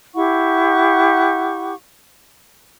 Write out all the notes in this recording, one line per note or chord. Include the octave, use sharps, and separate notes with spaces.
E4 G4 F#5 C#6